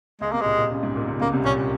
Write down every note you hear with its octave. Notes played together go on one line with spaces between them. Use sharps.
C#2 C#3 G#3
C2 C3 A#3
A#2 G#3
A#2
C#2 C#3
G#2
A#2
C#2 C#3
C#2 C#3 A#3
C2 C3
A#2 C#4